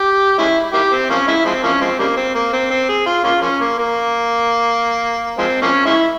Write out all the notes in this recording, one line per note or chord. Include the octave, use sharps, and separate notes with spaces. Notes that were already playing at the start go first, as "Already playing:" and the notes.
Already playing: G4
G#3 C#4 E4
A#3 E4 G4
C4
F3 A#3 C#4
G#3 C#4 E4
F3 G#3 C4
F3 A#3 C#4
F3 G#3 C4
C#3 G3 A#3
C4
A#3
C4
C4
G#4
F4
A#3 C#4 F4
F3 A#3 C#4
A#3
A#3
F3 G#3 C4
F3 A#3 C#4
G#3 C#4 E4